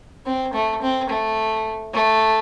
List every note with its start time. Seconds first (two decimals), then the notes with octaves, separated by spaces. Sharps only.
0.26 C4
0.54 A3
0.82 C4
1.10 A3
1.94 A3